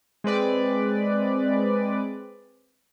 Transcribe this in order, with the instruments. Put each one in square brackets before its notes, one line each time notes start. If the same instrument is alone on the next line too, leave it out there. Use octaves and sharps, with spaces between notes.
[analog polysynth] G#3 C4 B4 D5